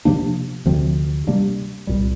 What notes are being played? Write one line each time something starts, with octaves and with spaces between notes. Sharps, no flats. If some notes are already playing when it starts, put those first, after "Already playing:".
C3 F3 A#3 D4
D2 C3 F3 C4
C3 G3 A#3 D4
C2 A#2 G3